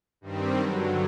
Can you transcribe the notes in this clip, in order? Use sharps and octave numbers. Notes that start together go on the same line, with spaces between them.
G2 D#3 G3 C4
G2 D3 F#3